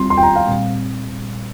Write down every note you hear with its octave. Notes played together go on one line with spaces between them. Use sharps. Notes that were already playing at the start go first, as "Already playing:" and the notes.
Already playing: G3 C4 F4 C6
C6
G5
A#5
F5
A#2 G3 C4